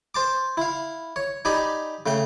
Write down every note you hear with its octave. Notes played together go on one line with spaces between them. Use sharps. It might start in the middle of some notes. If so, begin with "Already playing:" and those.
C5 A5 D6
E4 F5
C#5
D#4 G4 D5 G#5 B5
C#3 A3 G5